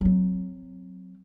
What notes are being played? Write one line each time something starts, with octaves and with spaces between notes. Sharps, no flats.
F#3 C4